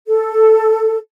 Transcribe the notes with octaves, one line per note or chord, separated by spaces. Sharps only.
A4